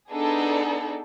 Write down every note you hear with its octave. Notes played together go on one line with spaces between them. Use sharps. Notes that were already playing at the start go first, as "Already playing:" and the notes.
B3 D4 D#4 G#4 A4